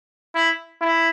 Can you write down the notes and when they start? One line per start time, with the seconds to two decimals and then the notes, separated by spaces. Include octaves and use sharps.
0.35 E4
0.82 E4